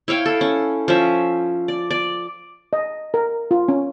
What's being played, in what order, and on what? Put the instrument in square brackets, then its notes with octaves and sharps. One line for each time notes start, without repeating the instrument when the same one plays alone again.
[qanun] E4 C#5 F5 G5
A4
C#4
F3 C#4 E5
D5
D5
[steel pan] D#5
A#4
F4
C#4